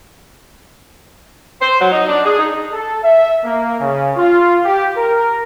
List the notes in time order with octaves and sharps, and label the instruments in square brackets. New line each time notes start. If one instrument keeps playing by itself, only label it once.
[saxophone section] C5
F#3
D#4
D4
G#4
D#4
[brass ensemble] A4
E5
A#3
C#3
F4
G4
A#4